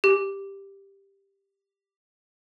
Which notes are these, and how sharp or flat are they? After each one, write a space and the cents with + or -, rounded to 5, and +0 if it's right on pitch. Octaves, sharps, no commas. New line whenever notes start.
G4 +5